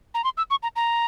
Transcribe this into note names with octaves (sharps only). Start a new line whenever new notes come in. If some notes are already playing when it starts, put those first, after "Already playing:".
A#5
C6
E6
C#6
A#5
A#5